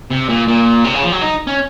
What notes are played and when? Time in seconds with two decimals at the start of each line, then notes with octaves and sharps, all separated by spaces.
0.11 C3
0.29 A#2
0.48 A#2
0.85 C3
0.94 C#3
1.04 F3
1.12 F#3
1.22 D#4
1.47 C#4